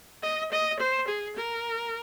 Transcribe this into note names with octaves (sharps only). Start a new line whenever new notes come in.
D#5
D#5
C5
G#4
A#4